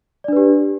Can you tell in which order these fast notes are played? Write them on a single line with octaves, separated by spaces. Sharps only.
D5 D4 B4 G4